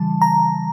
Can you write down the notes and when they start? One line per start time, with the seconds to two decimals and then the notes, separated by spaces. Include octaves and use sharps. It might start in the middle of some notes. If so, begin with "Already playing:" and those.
Already playing: C#3 E3 G3 A5
0.22 A#5